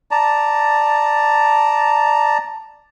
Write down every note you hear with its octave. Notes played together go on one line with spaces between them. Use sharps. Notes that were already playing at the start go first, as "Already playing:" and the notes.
D5 A5 A#5